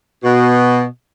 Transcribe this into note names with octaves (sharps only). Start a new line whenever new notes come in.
B2